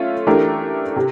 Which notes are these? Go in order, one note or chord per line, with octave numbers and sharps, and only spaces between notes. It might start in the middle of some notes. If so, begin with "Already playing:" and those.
Already playing: A3 C#4 F4
E3 A3 D4 G4 A#4
C3